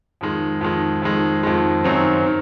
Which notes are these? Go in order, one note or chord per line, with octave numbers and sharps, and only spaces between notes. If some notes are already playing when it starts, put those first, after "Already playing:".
F2 D#3 G#3
F2 D#3 G#3
F2 D#3 G#3
F2 D#3 G#3
F#2 D#3 F#3 C4
D#3